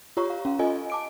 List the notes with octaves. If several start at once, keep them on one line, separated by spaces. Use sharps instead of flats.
F4 G4 C#5 A#5 C#6
F5
C#4 F5
F4 A4 D#5 G#5
A5 D6 D7